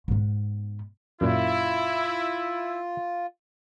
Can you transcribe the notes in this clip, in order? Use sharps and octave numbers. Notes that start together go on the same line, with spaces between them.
G#2 B3
F#2 A#2 E4 F4